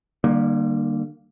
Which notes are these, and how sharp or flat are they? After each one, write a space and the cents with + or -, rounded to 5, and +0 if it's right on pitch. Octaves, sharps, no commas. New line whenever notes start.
D3 +45 G3 +0 A#3 +0